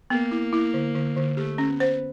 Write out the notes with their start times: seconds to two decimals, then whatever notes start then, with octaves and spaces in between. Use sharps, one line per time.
0.10 A#3 B3
0.31 E4
0.53 E4
0.74 D3
0.95 D3
1.16 D3
1.37 A3 G4
1.58 C#4
1.69 B3
1.80 C5